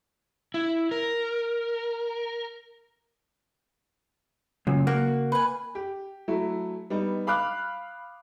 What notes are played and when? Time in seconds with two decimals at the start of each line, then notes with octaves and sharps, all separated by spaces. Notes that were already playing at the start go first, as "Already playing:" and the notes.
0.54 E4
0.91 A#4
4.67 F#2 A#2 C#3
4.87 A#3 F#4
5.32 B4 G#5
5.75 G4
6.28 F#3 A3 E4
6.90 G3 B3 D#4
7.27 F5 B5 D6 F6 F#6